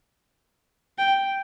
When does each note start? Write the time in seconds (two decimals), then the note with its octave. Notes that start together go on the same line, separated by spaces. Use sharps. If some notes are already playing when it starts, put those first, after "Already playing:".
0.98 G5